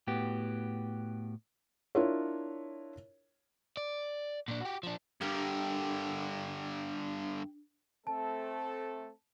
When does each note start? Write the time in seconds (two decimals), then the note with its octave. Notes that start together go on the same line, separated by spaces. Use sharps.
0.07 A2 B3 F#4 G4
1.95 D4 E4 F4 A#4 C#5
3.77 D5
4.48 A#2 D4
4.61 F#4 G4
4.83 F3 D4
5.21 G2 D3 D4 G4 A#4
8.07 A3 C4 A4 A5